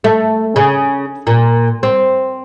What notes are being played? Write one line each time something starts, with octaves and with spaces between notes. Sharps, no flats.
A3
C#3
A#2
C4